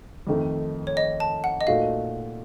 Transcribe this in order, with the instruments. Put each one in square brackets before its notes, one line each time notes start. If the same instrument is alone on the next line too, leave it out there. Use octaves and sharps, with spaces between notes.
[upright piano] F2 D#3 A3
[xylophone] C#5
D#5
A5
F#5
D#5
[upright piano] A#2 A3 D#4 F#4 [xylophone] F5